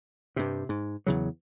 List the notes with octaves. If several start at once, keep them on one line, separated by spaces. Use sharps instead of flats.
G2 C3
G#2
E2 C#3 F#3